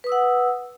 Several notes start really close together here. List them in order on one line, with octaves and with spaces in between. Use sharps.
B4 D#6 E6 F#5